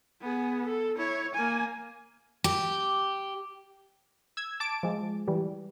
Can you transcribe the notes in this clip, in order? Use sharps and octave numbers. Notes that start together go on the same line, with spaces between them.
B3 G#4
A4
E4 C#5
A#3 G#5
G4
E6 G#6
A5 D6 D7
F3 G#3
E3 G3